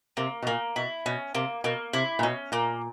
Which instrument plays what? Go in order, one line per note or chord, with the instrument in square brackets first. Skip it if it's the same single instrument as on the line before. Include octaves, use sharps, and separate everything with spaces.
[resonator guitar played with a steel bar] C3 [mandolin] A#3
[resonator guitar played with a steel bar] B2
[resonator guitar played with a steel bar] A#2 [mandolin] A#3
[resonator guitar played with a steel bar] B2 [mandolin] E4
[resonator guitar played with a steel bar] B2 [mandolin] C#4
[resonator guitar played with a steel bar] C3 [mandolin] A#3
[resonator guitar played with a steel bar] B2 [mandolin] A#3
[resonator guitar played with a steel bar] C3 [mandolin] E4
[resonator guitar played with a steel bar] A#2
[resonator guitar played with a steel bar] B2 [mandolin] C#4
[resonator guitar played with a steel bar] A#2 [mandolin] A#3